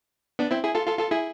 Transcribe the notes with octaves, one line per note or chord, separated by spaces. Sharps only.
B3 D4
C4 E4
E4 G#4
F4 A4
F4 A4
F4 A4
E4 G#4